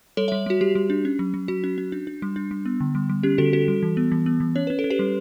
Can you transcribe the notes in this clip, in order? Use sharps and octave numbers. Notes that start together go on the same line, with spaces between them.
G3 A4 C#5
C#5 E5
G3
G3 F#4
G3 G4
G3
D4
C#4
F#3
F#3
F#3 F#4
C#4
C#4
D4
D4
G3
D4
G3
B3
D3
G3
G3
C#4 G4
D3 F#4 A4
C#4 F#4 A4
G3
E3
B3
E3
B3
E3
C#4 C#5
C#4 B4
A4
C#4
G4 B4
G3